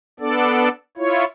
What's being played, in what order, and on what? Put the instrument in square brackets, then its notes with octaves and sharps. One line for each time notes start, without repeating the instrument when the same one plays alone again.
[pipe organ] B3 D4 A4 D5
E4 F4 C#5